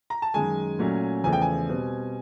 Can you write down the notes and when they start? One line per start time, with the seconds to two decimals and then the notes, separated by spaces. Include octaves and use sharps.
0.10 A#5
0.22 A5
0.34 F#2 D#3 G#3 G#5
0.79 A#2 F#3 A3 C#4
1.24 E2 C#3 F3 A3 G#5
1.33 G5
1.42 G#5
1.69 B2 G3 C4